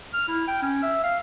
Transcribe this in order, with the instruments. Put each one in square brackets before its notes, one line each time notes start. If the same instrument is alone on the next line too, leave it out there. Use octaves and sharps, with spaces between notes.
[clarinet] F6
E4
G5
C#4
E5
F5